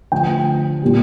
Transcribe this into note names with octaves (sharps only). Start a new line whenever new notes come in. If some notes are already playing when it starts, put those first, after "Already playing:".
D3 F3 A3 G5
A#2 G3